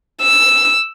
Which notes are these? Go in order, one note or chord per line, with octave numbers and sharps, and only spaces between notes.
E6